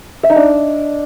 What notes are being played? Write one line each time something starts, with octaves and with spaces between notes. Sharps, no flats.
E5
D#4
D4